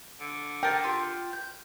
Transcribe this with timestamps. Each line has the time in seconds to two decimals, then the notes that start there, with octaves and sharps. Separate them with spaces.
0.20 D3
0.63 A#4 G5 A5
0.84 F4 G4
1.33 G6